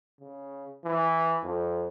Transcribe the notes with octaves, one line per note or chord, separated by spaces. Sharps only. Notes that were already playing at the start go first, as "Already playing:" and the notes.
C#3
E3
F2